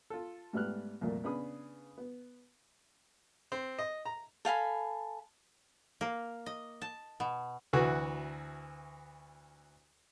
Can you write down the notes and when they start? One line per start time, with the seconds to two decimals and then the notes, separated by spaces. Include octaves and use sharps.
0.10 F4 A4
0.53 G#2 G3 A3 B3 F6 F#6
1.01 C2 F2 A#2 A3 A#3
1.24 C#3 B3 D4 G#4 B5 D#6
1.98 B3
3.52 C4
3.79 D#5
4.05 A#5
4.45 A4 F5 G#5 B5
6.01 A#3
6.46 D#5
6.82 A5
7.20 B2
7.73 D2 E3 F#4